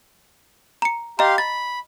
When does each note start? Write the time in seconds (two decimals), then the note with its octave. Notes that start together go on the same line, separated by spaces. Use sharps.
0.82 A#5 C#7
1.19 G4 D#5 F5 A#5 C6
1.38 B5 A6